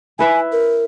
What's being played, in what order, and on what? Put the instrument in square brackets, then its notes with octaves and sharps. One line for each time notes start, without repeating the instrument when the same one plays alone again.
[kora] E4 B4 E5 [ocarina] G#5
[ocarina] A#4